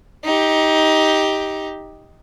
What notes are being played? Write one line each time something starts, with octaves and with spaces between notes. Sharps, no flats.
D#4 G4